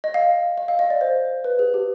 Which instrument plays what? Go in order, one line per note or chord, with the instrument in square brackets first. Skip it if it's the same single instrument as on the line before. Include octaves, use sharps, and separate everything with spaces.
[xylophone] D#5
F5
D#5
F5
D#5
D5
C5
B4
G#4
G4